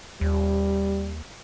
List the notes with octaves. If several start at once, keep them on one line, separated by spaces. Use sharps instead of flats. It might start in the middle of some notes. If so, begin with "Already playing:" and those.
D#2 G3